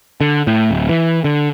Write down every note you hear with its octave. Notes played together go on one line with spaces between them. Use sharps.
D3
A2
D1
E3
D3